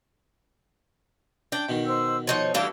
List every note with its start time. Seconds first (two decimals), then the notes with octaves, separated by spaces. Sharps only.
1.52 D4 G5
1.69 B2 D#3
1.88 C5 E6
2.27 F3 D#4 C#5 F#5
2.54 E3 G3 A3 D4 E4 F#4 F5 A5